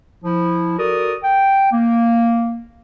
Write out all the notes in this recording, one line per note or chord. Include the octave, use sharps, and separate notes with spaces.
F3 E4
F#4 A4 A#4 D5 D#6
G5
A#3